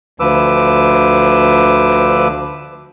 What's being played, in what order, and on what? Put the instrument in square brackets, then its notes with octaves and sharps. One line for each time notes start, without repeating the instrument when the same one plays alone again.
[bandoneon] D2 F3 B4 D6 E6